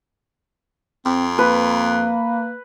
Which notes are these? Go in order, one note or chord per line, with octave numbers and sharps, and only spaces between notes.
F2 C4
A#3 B4